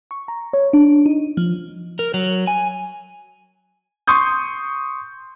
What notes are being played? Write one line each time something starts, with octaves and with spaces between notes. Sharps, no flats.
C#6
A#5
C#5
D4
D#4
F3
A#4
F#3
G#5
C6 C#6 D#6 G6